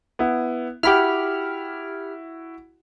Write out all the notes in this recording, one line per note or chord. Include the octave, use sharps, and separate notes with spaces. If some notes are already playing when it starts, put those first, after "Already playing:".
B3 E4
E4 F#4 G4 F#5 B5 F6